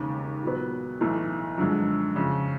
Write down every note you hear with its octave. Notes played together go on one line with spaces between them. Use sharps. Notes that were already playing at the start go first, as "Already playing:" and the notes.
Already playing: E1 D#2 C#3
A#2 F#3 B3
B1 A2 E3 A3
F#2 D3 F3 G#3
F2 C#3 F3